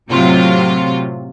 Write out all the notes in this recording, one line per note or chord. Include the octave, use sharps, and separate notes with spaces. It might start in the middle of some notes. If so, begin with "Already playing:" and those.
A2 C3 F#3 F4